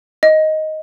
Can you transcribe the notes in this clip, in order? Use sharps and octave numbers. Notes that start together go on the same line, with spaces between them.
D#5